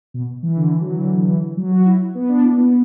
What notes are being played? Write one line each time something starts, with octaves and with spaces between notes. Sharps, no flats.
B2
E3
D3
E3
F#3
E3
D3
E3
F#3
F#4
E4
B3
D4
E4
B3